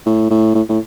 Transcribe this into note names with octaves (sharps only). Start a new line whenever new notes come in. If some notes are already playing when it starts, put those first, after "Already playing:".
A2
A2
A2
A2